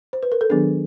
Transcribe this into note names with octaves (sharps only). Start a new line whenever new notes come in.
C5
B4
A#4
A4
D#3 F#3 B3 D4 G#4